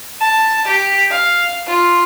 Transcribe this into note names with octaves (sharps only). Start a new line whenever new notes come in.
A5
G4
F5
F4